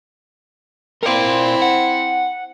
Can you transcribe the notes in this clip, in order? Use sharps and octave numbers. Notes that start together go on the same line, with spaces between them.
C4 E4 A#4 D5
F#5